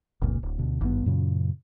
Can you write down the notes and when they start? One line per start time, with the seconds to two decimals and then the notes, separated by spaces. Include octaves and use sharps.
0.21 F1 C#2 A#2 C#3
0.43 D1
0.58 D2 B2
0.81 G#1 G2 B3
1.06 F#2 A#2 C#3